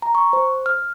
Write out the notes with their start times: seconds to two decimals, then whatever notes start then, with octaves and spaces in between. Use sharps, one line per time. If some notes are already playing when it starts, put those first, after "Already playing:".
0.02 A#5
0.15 C#6
0.33 C5
0.66 F6